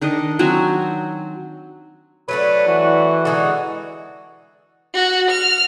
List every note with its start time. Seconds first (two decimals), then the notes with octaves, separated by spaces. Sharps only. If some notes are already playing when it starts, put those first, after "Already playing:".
0.01 D#3 D4 A#4 D#5
0.39 F#3 C4 F#4 G#5
2.29 F#3 A3 D4 B4
2.67 E3 F#4
3.25 D3 G#3 D#4 F#4
4.94 F#4
5.31 F6